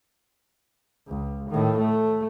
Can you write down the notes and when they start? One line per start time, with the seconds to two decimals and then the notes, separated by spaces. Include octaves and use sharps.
1.07 C#2
1.50 A2 D#3
1.78 A3